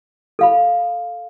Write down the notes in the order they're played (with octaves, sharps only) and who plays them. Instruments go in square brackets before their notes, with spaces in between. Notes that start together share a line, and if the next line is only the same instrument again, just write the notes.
[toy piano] A4 F5 B5